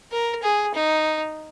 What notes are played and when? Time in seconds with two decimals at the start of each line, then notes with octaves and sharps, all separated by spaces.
0.12 A#4
0.43 G#4
0.74 D#4